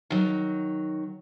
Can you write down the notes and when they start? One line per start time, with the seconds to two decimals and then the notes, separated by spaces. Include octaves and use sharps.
0.10 D#3 F#3